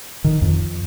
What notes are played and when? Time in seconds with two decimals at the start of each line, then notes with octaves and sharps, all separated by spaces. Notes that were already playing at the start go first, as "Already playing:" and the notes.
0.24 D#3
0.42 F2